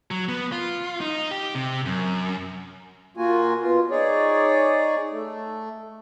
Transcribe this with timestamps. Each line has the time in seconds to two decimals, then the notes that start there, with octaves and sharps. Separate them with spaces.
0.11 F#3
0.29 B3
0.52 F4
1.01 D#4
1.31 G4
1.55 C3
1.85 F#2
3.17 A#2 A#3 F4 F#4 G#5
3.60 B2 F4
3.90 D#4 G#4 C#5 D5
5.11 A3